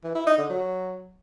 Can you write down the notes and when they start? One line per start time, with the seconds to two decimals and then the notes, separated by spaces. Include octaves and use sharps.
0.04 E3
0.15 E4
0.26 D#4
0.38 D3
0.49 F#3